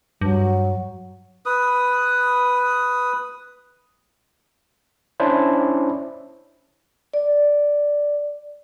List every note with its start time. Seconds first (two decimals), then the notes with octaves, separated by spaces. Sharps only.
0.21 G2 F#3
1.46 B4 D#6
5.20 C#4 D4 E4 C5
7.13 D5